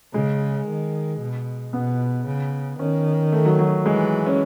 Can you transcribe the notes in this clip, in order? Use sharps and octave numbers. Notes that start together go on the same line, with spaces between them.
C#3 G#3
D#3
B2
B2 B3
C#3
D#3 C#4
A3
F#3
F#3
E3 G#3
C#4